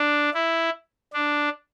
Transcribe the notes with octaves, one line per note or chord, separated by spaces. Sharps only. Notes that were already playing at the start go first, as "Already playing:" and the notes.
Already playing: D4
E4
D4